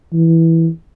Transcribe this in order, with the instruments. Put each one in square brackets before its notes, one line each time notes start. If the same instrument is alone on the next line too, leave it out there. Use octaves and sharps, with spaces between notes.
[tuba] E3